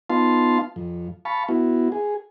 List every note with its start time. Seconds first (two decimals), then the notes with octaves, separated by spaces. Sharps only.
0.10 B3 D#4 F4 F5 A5 C6
0.76 F2
1.25 F5 A5 B5 C#6
1.49 B3 E4 F#4
1.92 G#4